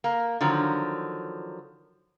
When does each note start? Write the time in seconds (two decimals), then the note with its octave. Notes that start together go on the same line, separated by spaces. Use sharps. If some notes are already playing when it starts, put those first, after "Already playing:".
0.04 A#3
0.41 D3 D#3 F3 F#3